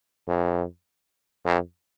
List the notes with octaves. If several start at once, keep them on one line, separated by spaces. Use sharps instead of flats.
F2
F2